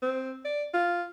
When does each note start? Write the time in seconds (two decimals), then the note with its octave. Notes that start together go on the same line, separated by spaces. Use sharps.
0.02 C4
0.45 D5
0.74 F4